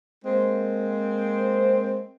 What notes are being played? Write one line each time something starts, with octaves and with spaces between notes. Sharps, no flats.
G#3 A#3 C4